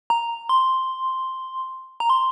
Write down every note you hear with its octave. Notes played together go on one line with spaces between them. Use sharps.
A#5
C6
A#5
C6